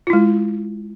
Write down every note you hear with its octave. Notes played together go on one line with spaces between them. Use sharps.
G#3 E4 F4